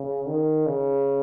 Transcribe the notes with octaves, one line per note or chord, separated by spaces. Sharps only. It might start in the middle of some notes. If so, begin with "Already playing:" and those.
Already playing: C#3
D#3
C#3